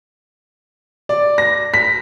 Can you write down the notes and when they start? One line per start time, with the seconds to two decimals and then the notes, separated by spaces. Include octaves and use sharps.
1.09 D5
1.38 A#6
1.74 B6